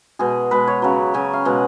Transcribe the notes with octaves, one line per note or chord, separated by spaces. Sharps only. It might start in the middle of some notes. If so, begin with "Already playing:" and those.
B2 G#3 G#4
B2 G#3 B4
C#5
C#3 F#3
C#3 F#3 G#5
F5
B2 G#3 F#5